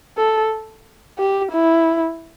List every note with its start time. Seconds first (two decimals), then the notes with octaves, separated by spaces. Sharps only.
0.18 A4
1.18 G4
1.52 E4